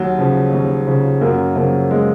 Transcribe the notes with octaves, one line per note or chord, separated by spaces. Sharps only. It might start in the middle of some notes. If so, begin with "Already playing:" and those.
Already playing: D#2 F#3
C#3 F3
D#2
C#3 F3
F#2 F#3 A#3
C#3 F3 F#3 A#3
G#3